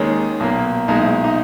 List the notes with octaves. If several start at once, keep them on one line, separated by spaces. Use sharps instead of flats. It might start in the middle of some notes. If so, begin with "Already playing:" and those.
Already playing: D#2 D#3 G#3 C#4
B1 A#2 A#3
B1 A#2 G#3 D#4
E4
D#4